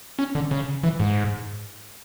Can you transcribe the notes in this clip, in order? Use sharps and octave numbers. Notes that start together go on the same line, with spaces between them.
C#4
D3
C#3
E3
G#2